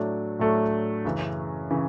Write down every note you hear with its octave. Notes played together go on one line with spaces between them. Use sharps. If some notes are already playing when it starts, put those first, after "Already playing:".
Already playing: A2 F#3 A3 D4
A2 F#3 A3 D4
F#2 C#3 E3
C#3 E3